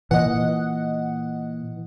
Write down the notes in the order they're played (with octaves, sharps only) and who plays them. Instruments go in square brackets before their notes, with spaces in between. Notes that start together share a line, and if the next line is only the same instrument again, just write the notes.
[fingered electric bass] A#2 [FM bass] E3 [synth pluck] D#5 F#5